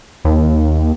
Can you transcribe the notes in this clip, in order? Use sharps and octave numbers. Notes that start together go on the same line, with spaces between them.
D#2